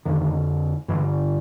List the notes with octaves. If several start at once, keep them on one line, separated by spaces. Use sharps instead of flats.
F2 D3 D#3
G2 D3 E3